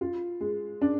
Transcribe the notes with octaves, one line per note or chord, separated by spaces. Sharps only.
F4
G#3
D4